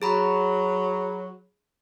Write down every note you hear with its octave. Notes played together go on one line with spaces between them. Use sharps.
F#3 G#4 A#5 B5